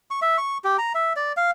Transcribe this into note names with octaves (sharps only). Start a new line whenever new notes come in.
C#6
E5
C#6
G4
A#5
E5
D5
F5